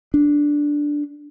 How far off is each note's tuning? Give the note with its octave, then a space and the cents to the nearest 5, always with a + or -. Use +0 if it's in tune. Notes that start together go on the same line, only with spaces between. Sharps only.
D4 -5